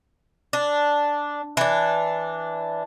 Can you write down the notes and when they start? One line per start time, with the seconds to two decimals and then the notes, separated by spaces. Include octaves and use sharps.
0.53 D4
1.57 E3 D4